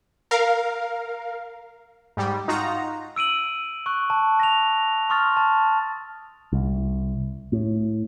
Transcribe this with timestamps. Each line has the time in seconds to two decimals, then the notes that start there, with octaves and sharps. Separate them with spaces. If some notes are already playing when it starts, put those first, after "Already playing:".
0.31 A#4 F5
2.17 G#2 G3
2.48 D#4 F4 F#4 A#5
3.16 E6 D7 D#7 F#7
3.86 C#6 F#6
4.10 A5
4.40 A#6 F7
5.10 C6 C#6 D#6 F6 A6
5.37 A5
6.53 C2
7.52 A2